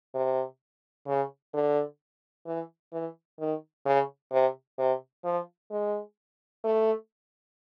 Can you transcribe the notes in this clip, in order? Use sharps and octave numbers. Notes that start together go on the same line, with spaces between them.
C3
C#3
D3
E3
E3
D#3
C#3
C3
C3
F3
G#3
A3